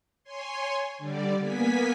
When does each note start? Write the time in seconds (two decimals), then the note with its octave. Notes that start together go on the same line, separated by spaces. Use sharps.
0.23 C#5 G#5 C6
0.98 D3 G3 D5
1.39 A#3 B3 G#5 B6